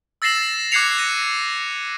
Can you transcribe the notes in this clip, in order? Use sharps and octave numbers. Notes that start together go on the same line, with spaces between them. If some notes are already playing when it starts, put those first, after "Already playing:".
E6 A6 A#6 C7 E7 F#7
D6 F#6 G#6 C7 C#7 F7
A#6 D#7